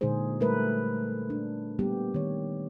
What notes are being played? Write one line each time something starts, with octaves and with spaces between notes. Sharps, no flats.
A#2 D3 G#3 D#4 G#4 C5
G3 A3 A#4 B4
D4
G3 A#3 B3 G4
D#3 C#5